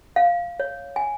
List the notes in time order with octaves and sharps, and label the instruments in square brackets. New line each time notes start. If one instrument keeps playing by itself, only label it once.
[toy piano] F5
C#5
G#5